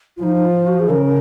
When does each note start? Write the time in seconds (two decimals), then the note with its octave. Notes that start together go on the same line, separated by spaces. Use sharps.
0.17 F4
0.22 F3 D#4
0.35 D#4
0.45 F4
0.67 F#4
0.80 G#4
0.90 C#3 A#4